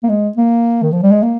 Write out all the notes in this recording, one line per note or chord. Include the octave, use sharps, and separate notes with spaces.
A#3
G#3
A#3
D#3
F3
G3
G#3
A#3